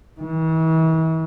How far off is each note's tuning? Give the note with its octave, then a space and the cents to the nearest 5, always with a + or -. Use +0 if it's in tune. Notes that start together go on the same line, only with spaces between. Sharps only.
E3 -40